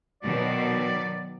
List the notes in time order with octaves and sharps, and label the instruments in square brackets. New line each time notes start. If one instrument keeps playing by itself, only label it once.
[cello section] B2 D#3 F#3 [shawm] D5